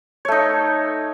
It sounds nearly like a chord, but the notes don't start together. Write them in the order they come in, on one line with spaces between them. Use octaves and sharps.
C#5 A3 D#4